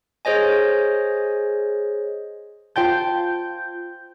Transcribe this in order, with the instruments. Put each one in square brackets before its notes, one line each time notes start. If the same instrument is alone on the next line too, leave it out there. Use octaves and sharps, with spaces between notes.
[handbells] G#4 C5 C#5 D#5 G#5
[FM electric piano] F4 G6 [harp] C5 G5 A5